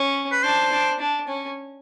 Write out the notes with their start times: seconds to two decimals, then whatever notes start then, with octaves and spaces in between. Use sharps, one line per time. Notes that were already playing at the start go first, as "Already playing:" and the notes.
Already playing: C#4
0.32 B4
0.43 D4 C5
0.72 D4
1.00 D4
1.28 C#4